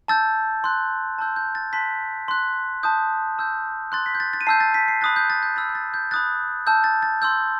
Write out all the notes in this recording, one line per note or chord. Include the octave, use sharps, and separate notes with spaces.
A5 E6 G6 A6
C6 F#6
A5 C6 E6 G6
G6
A6
A5 C6 F#6 B6
C6 F#6
A5 D#6 G6
A5 E6 G6
C6 F#6 A6
B6
G6
A6
A6
D#7
A5 E6 G6 C7
A6
B6
C7
B5 D#6 F#6 A6
G6
A6
G6
B5 E6 G6 A6
G6
A6
G6
B5 D#6 F#6 A6
A5 E6 G6
A6
A6
C6 E6 G6